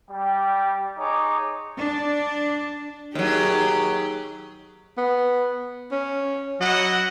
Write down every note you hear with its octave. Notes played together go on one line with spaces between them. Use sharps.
G3 G5
D#4 G#4 C#5 D6
D4
D#2 F#3 G4 G#4
B3
C#4
F#3 E4 D#5 F#5